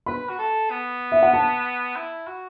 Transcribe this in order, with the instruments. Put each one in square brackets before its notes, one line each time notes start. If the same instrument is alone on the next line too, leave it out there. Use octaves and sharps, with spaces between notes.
[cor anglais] B4 [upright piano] B5
[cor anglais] F#4
A4
B3
[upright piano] E5
F#5
A5
[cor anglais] E4
F#4